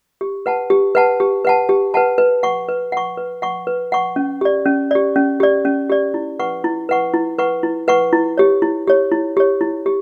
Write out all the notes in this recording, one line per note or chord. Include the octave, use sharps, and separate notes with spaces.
G4
B4 F#5 A5
G4
B4 F#5 A5
G4
B4 F#5 A5
G4
B4 F#5 A5
B4
F#5 C#6
B4
F#5 C#6
B4
F#5 C#6
B4
F#5 C#6
C#4
G4 D5
C#4
G4 D5
C#4
G4 D5
C#4
G4 D5
E4
B4 F#5 C#6
E4
B4 F#5 C#6
E4
B4 F#5 C#6
E4
B4 F#5 C#6
E4
G4 C#5
E4
G4 C#5
E4
G4 C#5
E4
G4